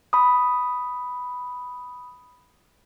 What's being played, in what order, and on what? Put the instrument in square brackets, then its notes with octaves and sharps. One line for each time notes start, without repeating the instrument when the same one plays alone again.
[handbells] B5 D#6